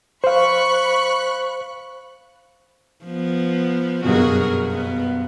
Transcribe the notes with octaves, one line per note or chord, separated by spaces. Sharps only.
C5 F5 B5 C#6 F#6
F3 B3
F#1 G2 B2 F#4 G#4 A#4
B3